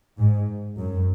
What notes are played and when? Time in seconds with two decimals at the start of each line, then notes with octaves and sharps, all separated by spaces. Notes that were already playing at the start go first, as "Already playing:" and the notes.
0.18 G#2
0.78 F#2